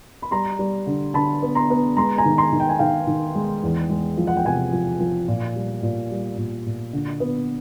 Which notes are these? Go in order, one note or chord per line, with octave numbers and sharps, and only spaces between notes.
B5
G3 A#5 C6
G3
D3
D3 A5 B5
B3
A#5 C6
B3
G#3 A#5 C6
G#5 A#5
D#3
A#5 C6
D#3
G5
G#5
D#3 F5 G5
D#3
G#3
E2
G#3
F3
F#5
G5
C3 F#5 G#5
F3
F3
A#2
G3
A#2
G3
A#2
A#2
D3
B3